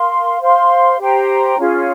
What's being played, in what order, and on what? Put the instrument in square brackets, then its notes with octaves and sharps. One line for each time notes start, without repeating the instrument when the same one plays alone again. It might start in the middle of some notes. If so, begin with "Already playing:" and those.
Already playing: [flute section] A#4 F5 C6
C5 F5 C6
G4 C5 G5 A#5
C#4 F4 G#4